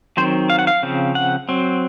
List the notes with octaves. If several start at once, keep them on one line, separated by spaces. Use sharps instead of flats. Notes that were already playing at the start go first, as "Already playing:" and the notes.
D#3 F#3 C4 C5
F5
F#5
F5
C#3 F3 C4
F#5
F#3 C4